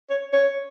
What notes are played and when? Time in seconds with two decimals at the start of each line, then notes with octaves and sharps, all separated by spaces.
0.10 C#5
0.33 C#5